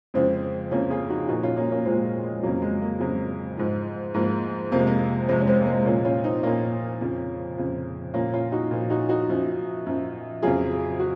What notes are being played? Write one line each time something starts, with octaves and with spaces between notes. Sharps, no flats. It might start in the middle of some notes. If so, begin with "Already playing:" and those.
F2 C#3 F3 G#3 C4
F2 C#3 F3 A#3 C#4
F4 G#4
D#4 F#4
A#2 F3 D#4 F#4
C#4 F4
A#3 C#4
A#3 C#4
A#2 F3 G#3 C4
G#3
F2 C#3 F#3 A#3
G#3
A#3
F2 C#3 F#3 G#3
G#2 F3
G#2 F3 A#3
F2 C3 F3 A#3
G#3
A#3
F2 C3 F3 G#3 C4
C#4
G#3 C4
A#3
G#3 C4
A#2 F3 A#3 C#4
C#4 F4
C4 D#4
A#2 F3 A#3 C#4
F2 C#3 F3
F2 C#3 F3
A#2 F3 A#3 C#4
C#4 F4
D#4 F#4
A#2 F3
D#4 F#4
D#4 F#4
F#2 F3
F#2 F3
F2 C#3 F#3 F4 G#4
F#4